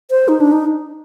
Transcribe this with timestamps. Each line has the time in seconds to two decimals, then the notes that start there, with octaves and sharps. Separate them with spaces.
0.11 C5
0.28 D#4
0.41 D4
0.52 D#4